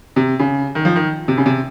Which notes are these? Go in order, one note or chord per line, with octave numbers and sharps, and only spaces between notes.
C3
C#3
D#3
F3
D#3
C3
C#3
C3